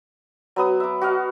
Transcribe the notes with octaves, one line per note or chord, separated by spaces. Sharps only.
F#3 B3 D#6
E5 D6
F#4 D#5 F5